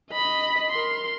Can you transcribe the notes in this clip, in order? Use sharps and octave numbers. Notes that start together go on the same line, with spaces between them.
D#5 B5
A#4 C6